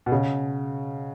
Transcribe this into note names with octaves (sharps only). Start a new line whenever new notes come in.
B2
C#3